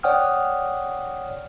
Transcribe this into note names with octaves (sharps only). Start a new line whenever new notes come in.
C#5 D5 F#5 G5 D#6 F6